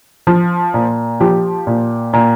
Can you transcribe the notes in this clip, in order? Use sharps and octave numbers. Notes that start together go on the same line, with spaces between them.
F3
A#2
F3 G4
A#2
A#2